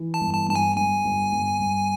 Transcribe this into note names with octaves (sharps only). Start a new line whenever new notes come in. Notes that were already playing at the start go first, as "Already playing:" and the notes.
Already playing: E3
A5
G1
A5
G2 A5
G#5
G2 G#5
G1
G1
G1